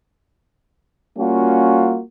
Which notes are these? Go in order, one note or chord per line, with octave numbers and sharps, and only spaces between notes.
G3 A#3 C#4 F4 F#4